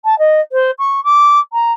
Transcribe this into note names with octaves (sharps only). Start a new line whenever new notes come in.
A5
D#5
C5
C#6
D6
A#5